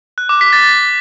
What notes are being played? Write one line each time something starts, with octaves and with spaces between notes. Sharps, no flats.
F#6
D6
B6
A6